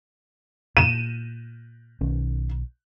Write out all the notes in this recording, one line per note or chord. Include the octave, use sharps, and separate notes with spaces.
A#2 D#7 E7
B1 D#3 C#4